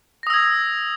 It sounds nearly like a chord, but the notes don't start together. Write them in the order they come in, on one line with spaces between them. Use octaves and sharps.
A#6 D#6 E6 G#6